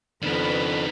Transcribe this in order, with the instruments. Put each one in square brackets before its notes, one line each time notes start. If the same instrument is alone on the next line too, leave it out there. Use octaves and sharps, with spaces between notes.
[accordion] F2 [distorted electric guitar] D#3 D4 [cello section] B3 B4